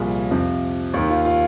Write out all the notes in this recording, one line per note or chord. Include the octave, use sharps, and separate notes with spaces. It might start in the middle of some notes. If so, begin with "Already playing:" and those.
Already playing: C2 A#2 F3 G#4
F2 C3 F3
D#2 D#3
F4
F4